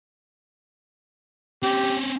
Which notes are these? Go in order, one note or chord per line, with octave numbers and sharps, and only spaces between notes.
C4 C#4 G4